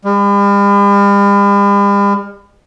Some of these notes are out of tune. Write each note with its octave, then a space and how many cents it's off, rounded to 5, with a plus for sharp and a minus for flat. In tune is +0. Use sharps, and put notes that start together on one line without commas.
G3 +45